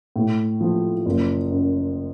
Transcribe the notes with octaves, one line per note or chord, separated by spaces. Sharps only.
A2
F3
F#1
F#2